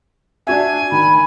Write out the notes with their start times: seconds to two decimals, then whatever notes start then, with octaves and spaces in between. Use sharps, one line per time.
0.47 D4 F#4 E5 G#5
0.92 D#3 B5